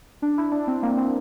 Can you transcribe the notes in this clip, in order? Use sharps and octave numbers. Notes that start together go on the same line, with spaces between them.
D4
E4
D4
C4
A#3
C4